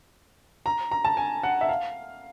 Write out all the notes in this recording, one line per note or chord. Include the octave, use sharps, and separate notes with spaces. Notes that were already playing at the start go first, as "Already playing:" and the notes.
A#5
A#5
A5
G#5
F#5
E5
F5